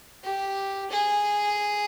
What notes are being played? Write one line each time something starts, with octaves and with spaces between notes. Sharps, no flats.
G4
G#4